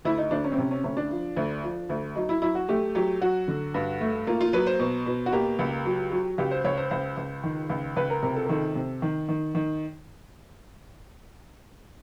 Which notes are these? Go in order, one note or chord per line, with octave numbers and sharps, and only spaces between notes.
D2 E4
D#4
D2 D4
C#4
C4
C3 C#4
C#4
D2 C#4
D4
F3
D2
F3
D2
F#3 D#4
E4
F#3 E4
F#4
A3 G4
F#3 G4
F#3 F#4
D3
G2
A3
A#3 F4
F4
F#3 B4
C5
B2
B2
F#4
A#3 G4
C#2
F#3
F#3
C#2 G4
C5
C#2 C#5
C5
C#2 C5
C#2
D#3
C#2
C#2 B4
A#4
C3 A#4
A4
A#4
D#3 A4
C3
D#3
D#3
D#3